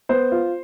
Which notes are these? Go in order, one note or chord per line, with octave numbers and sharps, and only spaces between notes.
B3 C5
F4